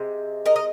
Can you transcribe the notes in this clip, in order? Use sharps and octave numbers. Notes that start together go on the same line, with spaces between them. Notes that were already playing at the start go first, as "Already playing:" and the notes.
Already playing: C3 G#3
A#4 D#5
D#5